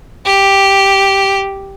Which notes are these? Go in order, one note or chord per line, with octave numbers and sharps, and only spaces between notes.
G4